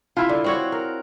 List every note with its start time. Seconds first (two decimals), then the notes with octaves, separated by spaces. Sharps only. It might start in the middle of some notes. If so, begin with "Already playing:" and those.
0.17 E4 F4
0.29 D3
0.44 C4 F#4 C#5
0.72 A#4